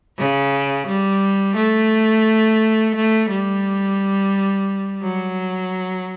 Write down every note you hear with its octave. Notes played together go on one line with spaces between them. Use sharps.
C#3
G3
A3
A3
G3
F#3